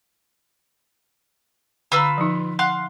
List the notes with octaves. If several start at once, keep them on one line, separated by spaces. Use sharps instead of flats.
D3 F4 B4 A#5 E6
F3 D#4
F5 F#5 C6 F#6